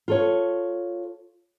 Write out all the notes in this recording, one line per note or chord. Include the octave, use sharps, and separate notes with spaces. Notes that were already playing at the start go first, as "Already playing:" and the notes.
F4 A4 C#5